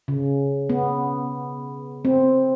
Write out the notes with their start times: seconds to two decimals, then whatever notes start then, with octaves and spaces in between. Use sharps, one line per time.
0.08 C#3
0.70 B3
2.05 C4